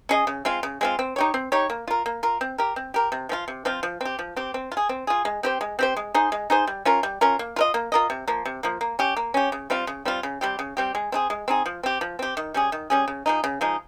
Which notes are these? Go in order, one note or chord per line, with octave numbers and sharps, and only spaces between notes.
C#4 G#4 D#5
C#3
G#3 C4 F4
C#3
G#3 C4 F4
C4
D#4 G4 C#5
C4
D#4 G4 C#5
A#3
F4 A#4
A#3
F4 A#4
C4
G4 A#4
C4
G4 A#4
C3
F3 C4 F4
C3
F3 C4 F4
F3
C4 G4
F3
C4 G4
C4
F4
G#4
C4
F4 G#4
G#3
C4 G4 C5
G#3
C4 G4 C5
G#3
D#4 G#4 C5
G#3
D#4 G#4 C5
G3
C#4 F4 A#4
G3
C#4 F4 A#4
A#3
F4 A#4 D#5
A#3
F4 A#4 D#5
C3
F3 A#3
C3
F3 A#3
A#3
C#4 G4
A#3
C#4 G4
C#3
G3 C4 F4
C#3
G3 C4 F4
C#3
G3 C4 G4
C#3
G3 C4 G4
G#3
C4 D#4 G#4
G#3
C4 D#4 G#4
F3
C4 G4
F3
C4 G4
D#3
G3 C#4 G#4
D#3
G3 C#4 G#4
C#3
F3 G#3 D#4
C#3
F3 G#3 D#4